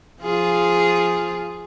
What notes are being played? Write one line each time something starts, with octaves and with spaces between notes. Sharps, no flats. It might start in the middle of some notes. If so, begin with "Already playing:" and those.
F3 F4 G#4